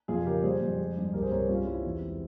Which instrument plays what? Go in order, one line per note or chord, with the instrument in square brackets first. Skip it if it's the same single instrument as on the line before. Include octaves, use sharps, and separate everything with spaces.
[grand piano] F2 F4 G#4
C#3 G4 A#4
G3 G#4 C5
F2
G#3
G2
C2 G4 A#4
G#4 C5
C2 A#4 C#5
G#4 C5
G3 C#4 F4
G3 C4 E4
E2
G#3